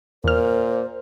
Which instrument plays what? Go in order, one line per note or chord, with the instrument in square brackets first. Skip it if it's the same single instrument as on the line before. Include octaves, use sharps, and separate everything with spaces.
[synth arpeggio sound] E2 F6 [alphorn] A#2 [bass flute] A#4 [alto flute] C5